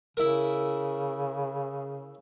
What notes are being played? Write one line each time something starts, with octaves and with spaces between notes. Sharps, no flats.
C#3 E4 A#4